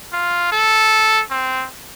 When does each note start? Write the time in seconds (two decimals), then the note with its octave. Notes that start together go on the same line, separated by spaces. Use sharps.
0.13 F4
0.52 A4
1.31 C4